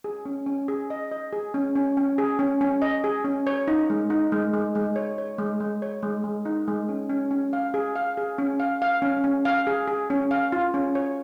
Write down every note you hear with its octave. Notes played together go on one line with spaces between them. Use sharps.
G#4
C#4
C#4
G#4
D#5
D#5
G#4
C#4
C#4
C#4
G#4
C#4
C#4
D#5
G#4
C#4
C#5
D#4
G#3
D#4
G#3
G#3
G#3
C#5
C#5
G#3
G#3
C#5
G#3
G#3
D#4
G#3
C#4
C#4
C#4
F5
G#4
F5
G#4
C#4
F5
F5
C#4
C#4
F5
G#4
G#4
C#4
F5
F4
C#4
C#5